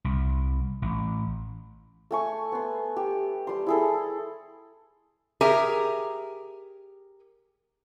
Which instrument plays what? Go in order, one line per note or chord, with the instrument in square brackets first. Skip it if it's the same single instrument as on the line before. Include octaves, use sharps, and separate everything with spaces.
[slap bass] C2
A1
[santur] A3 G#5 C#6
B3 C6
G4
G3 C6
E4 G#4 A4
[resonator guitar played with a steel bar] G4 G#4 A#4 E5 G#5